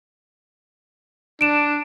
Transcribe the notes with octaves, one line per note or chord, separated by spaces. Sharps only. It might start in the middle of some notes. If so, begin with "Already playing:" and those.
D4 D7 E7